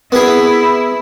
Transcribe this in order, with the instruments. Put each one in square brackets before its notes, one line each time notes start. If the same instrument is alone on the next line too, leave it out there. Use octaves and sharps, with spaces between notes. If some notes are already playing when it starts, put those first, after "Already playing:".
[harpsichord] B3 G#4 [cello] E4